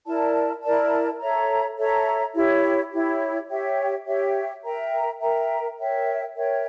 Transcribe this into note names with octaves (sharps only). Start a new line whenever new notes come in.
E4 A#4 D5 A5
E4 A#4 D5 A5
A4 C#5 E5 A#5
A4 C#5 E5 A#5
E4 G4 C#5
E4 G4 C#5
G4 C#5 E5 G5
G4 C#5 E5 G5
A#4 E5 G5 A#5
A#4 E5 G5 A#5
A#4 C#5 E5 G5
A#4 C#5 E5 G5